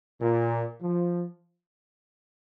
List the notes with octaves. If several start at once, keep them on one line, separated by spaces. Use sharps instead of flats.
A#2
F3